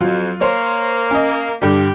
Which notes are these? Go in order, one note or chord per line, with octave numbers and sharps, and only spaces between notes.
F2 F#3 F4
A#3 C5 C#5
C#4 D#5
G2 D3 G3 G4